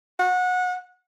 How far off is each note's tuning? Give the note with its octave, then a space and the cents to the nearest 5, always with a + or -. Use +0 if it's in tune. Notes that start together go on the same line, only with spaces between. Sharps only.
F#5 -25